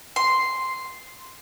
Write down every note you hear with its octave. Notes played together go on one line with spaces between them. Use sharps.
C6